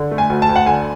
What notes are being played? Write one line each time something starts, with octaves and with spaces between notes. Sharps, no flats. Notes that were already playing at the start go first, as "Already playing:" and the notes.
Already playing: D3
A3
G#5
D2
A5
D2
F#5
D3 G#5